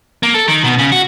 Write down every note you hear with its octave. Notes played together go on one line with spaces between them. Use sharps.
A#3
A4
D#3
B2
C#3
F#4